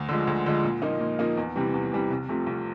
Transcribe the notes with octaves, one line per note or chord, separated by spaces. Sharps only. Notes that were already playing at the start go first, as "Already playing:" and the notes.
Already playing: D2
D3 F3 G#3
D2
D3 F3 G#3
A#2
F3 A#3 D#4
A#2
F3 A#3 D#4
E2
C3 E3 G3
E2
C3 E3 G3
C2
C3 F3 A3
C2